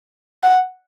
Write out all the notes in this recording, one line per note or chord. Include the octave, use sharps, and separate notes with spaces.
F#5